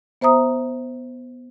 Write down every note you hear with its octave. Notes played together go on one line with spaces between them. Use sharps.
B3 C5 E5 A#5 D#6